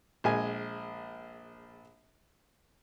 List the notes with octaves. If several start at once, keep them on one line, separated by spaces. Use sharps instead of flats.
A#1 G#3 G#5